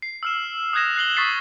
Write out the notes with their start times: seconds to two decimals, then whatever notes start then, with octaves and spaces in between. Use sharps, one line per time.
0.02 C7
0.23 E6 F6 E7
0.73 D#6 E6 F#6 G#6 A#6 E7
0.96 F#6 C7 F#7 G7
1.17 C#6 D#6 A6 B6 C7